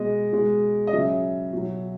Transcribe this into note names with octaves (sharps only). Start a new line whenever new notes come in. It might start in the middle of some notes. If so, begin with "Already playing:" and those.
Already playing: B2 G#3 D#5
B2 G#3
D#5
C#3 F#3 E5
B2 F#3